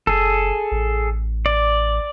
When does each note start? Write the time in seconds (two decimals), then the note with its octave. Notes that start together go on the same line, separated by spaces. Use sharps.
0.07 F#1 G#4 A4
0.72 A1
1.46 D5